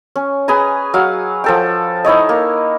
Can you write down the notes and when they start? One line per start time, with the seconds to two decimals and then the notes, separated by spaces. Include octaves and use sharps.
0.16 C#4
0.48 G#4 B4 G#5 A#5
0.94 F#3 F5 F#5
1.44 F3 A4 G5
2.05 D#4 E4 C#5 D#5
2.29 A#3